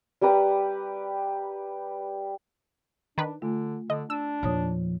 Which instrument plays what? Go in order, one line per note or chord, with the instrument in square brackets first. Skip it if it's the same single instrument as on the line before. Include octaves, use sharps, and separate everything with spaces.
[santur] G3 G4 B4 A#5
[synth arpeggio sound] D#3 B4 [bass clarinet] D4
[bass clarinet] D3 [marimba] A3 F4
[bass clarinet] D3 [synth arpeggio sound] D#5
[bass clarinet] D4 [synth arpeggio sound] E6
[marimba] E2 C#5 D#6 [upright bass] A#2 F3